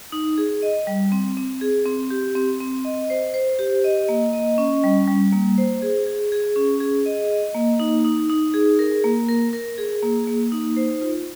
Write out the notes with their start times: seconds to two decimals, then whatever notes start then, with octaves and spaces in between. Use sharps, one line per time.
0.12 D#4
0.38 G#4
0.62 D#5
0.87 G3
1.12 C4
1.37 C4
1.61 G#4
1.86 C4
2.10 G4
2.35 C4
2.61 C4
2.85 D#5
3.10 C5
3.34 C5
3.59 G4
3.84 D#5
4.09 A#3
4.33 D#5
4.58 C#4
4.84 G3
5.08 G3
5.32 A#3
5.58 C5
5.82 G#4
6.07 G#4
6.32 G#4
6.56 C#4
6.80 G#4
7.06 D#5
7.30 D#5
7.55 A#3
7.80 D#4
8.05 D#4
8.30 D#4
8.54 G#4
8.79 A#4
9.04 A#3
9.28 A#4
9.53 A#4
9.78 G#4
10.03 A#3
10.27 A#3
10.52 D#4
10.77 C5
11.02 F4